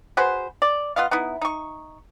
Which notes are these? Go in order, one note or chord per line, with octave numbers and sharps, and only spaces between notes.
F#4 G#4 B4 C5
D5
B3 F4 D#5 F5
B3 D#4 E4
D#4 C#6